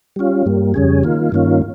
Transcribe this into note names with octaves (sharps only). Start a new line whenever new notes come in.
G3 C#4 F4
G2 G3 A#3
F2 C#3 G3 C#4 G#4
D#3 A#3 F4
G2 D#3 A#3 C#4 F4